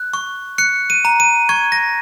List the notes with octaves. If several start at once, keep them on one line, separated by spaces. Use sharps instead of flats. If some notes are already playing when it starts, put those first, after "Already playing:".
Already playing: F#6
C#6
F#6 C#7
D#7
A#5
D#7
C#6 G#6
A#6